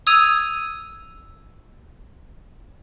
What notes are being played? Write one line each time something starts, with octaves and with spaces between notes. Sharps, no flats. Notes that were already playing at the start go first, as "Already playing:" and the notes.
D#6 E6 G#6 D#7 F7